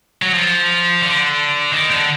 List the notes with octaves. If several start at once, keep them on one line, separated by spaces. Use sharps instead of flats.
F#3
F3
D3
D#3
D3